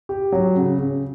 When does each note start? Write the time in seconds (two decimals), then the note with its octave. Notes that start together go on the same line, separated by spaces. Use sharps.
0.09 G4
0.32 F#3
0.56 C#3
0.79 C#3